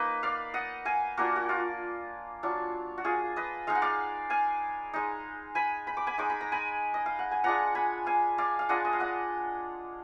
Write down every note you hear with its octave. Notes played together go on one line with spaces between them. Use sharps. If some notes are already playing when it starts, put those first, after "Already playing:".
Already playing: A#3 D#4 B4 D#5
D5 F5
D#5 F#5
F5 G#5
A#3 D4 F4 F#4 A#4
F#4
F4
F#3 D4 F4
F#4
F4 G#4
B4 D#5
G#3 D#4 F5
F#5
D5 F5
F5 G#5
G#3 D#4
G#5 B5
B5
D6
G#5 B5
G#3 D#4 D6
B5
A#5
G#5 B5
D#5
F5
F#5
G#5
G#3 D4 F4 F#5 A#5
G#5 B5
F5 G#5
D5 F5
F5
G#3 D4 F4 D#5 F#5
D#5
F5
D#5 F#5